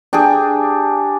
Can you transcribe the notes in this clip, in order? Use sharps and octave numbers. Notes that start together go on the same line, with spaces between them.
D4 G4 G#4